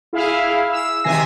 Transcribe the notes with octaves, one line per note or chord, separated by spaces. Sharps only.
E4 G#4 F5
E6
C3 D#3 E5 G#5 A#6 C7